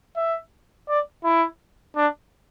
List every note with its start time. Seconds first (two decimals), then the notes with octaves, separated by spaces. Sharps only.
0.17 E5
0.89 D5
1.24 E4
1.96 D4